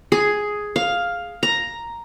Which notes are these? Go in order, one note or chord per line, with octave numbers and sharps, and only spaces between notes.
G#4
F5
A#5